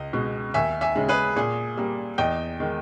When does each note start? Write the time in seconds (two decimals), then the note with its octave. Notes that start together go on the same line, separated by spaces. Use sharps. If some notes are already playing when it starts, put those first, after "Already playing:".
Already playing: C#2 D#5
0.13 B2 G#3
0.54 D#2 E5 G#5
0.81 E5 G#5
0.95 C#3 G#3
1.09 G#4 B4
1.36 A#2 G#4
1.77 G3 A#3
2.18 E2 D#5 G5
2.60 D#3 G#3